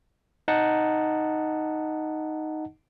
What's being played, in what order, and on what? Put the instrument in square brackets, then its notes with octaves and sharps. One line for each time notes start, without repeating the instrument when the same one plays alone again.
[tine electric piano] D#4 D#5 F#5 A5